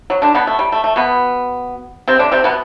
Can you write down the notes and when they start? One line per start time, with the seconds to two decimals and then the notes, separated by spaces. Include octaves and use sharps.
0.10 F#3
0.22 D3 D4
0.34 B2 B3
0.47 A3
0.59 G3
0.72 A3
0.84 A3
0.96 B2 B3
2.08 C3 C4
2.19 D3 D4
2.32 C3 C4
2.44 B2 B3